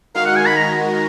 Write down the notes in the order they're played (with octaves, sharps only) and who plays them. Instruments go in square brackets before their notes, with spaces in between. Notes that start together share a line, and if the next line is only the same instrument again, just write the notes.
[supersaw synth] D#3 G#3 D#4 F#4 A#4 [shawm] F5
[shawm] F#5
G#5
B5
A#5